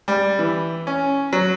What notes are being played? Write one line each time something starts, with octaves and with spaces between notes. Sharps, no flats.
G3
E3
C#4
F#3